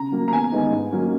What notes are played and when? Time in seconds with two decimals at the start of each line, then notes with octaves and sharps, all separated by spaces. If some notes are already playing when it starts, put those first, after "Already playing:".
Already playing: C#3 A#5
0.12 F#3 A#3
0.28 A#5
0.32 E2 G#5
0.52 D#3 G#3 B3 D#4
0.72 G#2
0.92 F#3 A#3 C#4